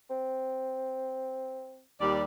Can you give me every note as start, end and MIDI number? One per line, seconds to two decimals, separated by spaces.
0.10 1.82 60
2.01 2.23 39
2.01 2.23 55
2.01 2.23 74